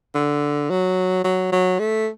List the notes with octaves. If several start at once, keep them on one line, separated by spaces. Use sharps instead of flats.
D3
F#3
F#3
F#3
A3